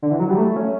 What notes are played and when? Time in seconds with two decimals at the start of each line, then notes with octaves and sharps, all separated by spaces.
0.02 D3
0.11 E3
0.20 F#3
0.30 G3
0.38 A3
0.56 C#4